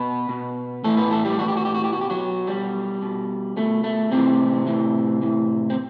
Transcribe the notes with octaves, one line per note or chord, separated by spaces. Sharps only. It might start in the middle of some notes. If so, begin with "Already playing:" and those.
Already playing: B2 B3 B4
B2
A2 E3 A3 A4
B3 B4
A3 A4
G3 G4
A2 E3 F#4
G4
F#4
G4
F#4
G4
B2 F#4
G4
F#3 F#4
B2 G3
B2
B2 A3
A3
A2 C3 E3 C4
A2 E3
A2 E3
C4